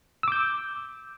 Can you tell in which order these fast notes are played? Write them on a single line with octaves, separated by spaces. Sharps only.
E6 D6 G6